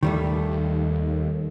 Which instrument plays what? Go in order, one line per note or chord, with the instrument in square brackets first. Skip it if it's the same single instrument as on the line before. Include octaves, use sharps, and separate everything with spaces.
[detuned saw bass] D#2 [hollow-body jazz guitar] D#3 G3 A3